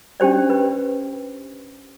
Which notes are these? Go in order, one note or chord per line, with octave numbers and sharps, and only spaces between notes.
C#4 D4 G4 C5 D5
B4